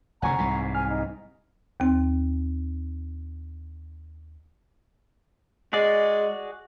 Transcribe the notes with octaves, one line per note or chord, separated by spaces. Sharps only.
F1 D2 C#3 F#5 G#5 A#5 C#6
C2 G#2
G#5 F6
D#4
D#2 C4
G#3 F#4 G#4 D5